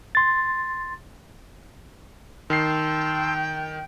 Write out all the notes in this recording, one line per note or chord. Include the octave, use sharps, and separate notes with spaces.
C6 A6
D#3 G5 A5 C6 E6 C7